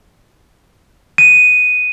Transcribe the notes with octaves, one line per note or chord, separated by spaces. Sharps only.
D#7